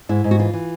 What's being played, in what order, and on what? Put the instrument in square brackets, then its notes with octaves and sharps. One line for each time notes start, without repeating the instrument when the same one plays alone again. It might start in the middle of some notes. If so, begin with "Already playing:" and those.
[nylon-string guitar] G#2 E4
G#2
F#4
E3 F4
E3